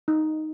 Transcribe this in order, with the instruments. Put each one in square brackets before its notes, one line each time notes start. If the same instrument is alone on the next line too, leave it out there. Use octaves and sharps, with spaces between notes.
[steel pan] D#4